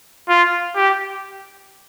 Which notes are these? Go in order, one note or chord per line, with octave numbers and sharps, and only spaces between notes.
F4
G4